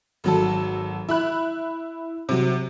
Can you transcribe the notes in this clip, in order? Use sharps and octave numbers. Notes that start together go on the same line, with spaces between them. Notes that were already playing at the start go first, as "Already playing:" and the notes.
G#1 F#3 A4
E4 B5 F#6
C3 F#3